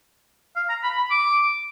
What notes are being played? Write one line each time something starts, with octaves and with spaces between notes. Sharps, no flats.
F5
A#5
B5
B5
D6